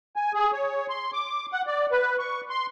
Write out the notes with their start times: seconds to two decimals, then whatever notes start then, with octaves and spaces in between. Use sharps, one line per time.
0.16 G#5
0.34 G#4
0.53 C#5
0.89 C6
1.13 D6
1.52 F#5
1.67 D5
1.91 B4
2.19 C#6
2.50 C6